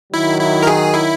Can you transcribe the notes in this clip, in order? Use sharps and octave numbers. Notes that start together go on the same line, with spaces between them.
D#3 F#3 E4
E4
A#4
G#4
E4